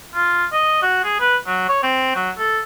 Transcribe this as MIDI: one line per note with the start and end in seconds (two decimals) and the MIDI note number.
0.14 0.45 65
0.52 0.80 75
0.82 1.00 66
1.04 1.16 68
1.20 1.37 71
1.47 1.65 54
1.68 1.81 73
1.83 2.14 60
2.15 2.31 54
2.38 2.60 69